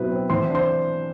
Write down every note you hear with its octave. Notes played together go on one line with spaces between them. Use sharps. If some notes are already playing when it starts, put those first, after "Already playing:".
Already playing: B2 F#3 C4 E4 B4
C4
E3 C5 C6
D4
C5 C6